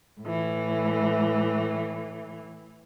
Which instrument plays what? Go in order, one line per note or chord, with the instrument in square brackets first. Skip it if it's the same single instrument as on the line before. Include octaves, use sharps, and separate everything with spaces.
[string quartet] A2 E3